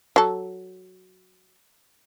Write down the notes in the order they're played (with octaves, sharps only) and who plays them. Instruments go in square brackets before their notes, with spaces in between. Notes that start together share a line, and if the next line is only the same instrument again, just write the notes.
[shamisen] F#3 A4